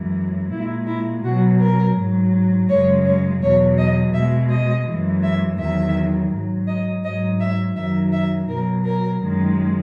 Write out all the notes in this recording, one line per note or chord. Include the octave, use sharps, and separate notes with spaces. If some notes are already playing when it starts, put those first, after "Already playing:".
Already playing: F#2 E3 G#3
A#2 G#3 E4
E4
B2 F#3 F#4
A#4
G#2 F#3
F#2 C#3 G#3 C#5
C#5
E2 B2 F#3 C#5
D#5
B2 G#3 E5
D#5
F#2 E3 G#3
E5
E2 D#3 F#3 E5
G#2 F#3
D#5
G#2 F#3 D#5
E5
F#2 D#3 F#3 E5
E5
B2 F#3 A#4
A#4
F#2 D#3 G#3